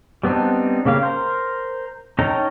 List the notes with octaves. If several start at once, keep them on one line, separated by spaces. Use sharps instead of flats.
G3 B3 C4 D4 D#4
C#3 A#3 G4 F5
A#4 C5
C#4 D#4 A4 G5 A#5